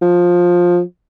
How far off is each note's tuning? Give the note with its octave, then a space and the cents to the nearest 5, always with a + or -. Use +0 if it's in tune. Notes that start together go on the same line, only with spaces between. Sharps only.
F3 +15